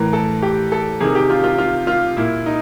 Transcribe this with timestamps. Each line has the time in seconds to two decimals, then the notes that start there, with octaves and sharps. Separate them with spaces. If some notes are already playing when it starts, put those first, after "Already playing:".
Already playing: A2 E3 A#4
0.13 A4
0.42 G4
0.72 A4
1.00 C3 D#3 G#4
1.15 G4
1.30 F4
1.44 F4
1.58 F4
1.87 F4
2.17 A#2 E4
2.46 D#4